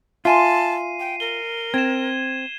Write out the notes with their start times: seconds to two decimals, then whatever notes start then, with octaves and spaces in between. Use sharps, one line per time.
0.25 F4 E5 G#5 A5 C6 C7 D#7
1.00 G5
1.20 A#4 G7
1.74 C4 G#6 E7